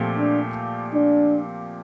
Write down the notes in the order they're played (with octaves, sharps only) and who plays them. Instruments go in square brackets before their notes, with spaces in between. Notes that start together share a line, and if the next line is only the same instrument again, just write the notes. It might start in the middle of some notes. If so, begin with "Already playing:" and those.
Already playing: [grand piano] A#2 F3 A3 C4 G4
[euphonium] D4
D4